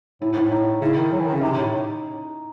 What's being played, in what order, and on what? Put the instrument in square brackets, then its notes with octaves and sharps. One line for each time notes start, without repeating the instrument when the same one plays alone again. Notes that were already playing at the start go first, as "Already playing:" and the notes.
[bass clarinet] A2 [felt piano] E4
[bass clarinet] G#2
[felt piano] E4
[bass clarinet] A2
[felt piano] E4
D#4
[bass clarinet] C#3 [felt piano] E4
[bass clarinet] D#3
F#3
E3
D#3
[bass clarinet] C#3 [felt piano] C#4
[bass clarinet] C3 [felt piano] D#4
[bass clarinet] C3
A2